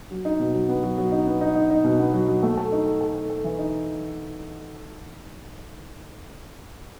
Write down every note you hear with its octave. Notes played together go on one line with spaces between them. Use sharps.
F#3
D#4
B2
F#3
B3
F#3
F#3
D#4
B3
D#4
D#4
D#4
B2
B3
F#3
F#3
A3
A4
D#4
A4
A4
A4
A4
E3
D#4